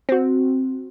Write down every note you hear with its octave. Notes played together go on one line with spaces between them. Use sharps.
C4 F#4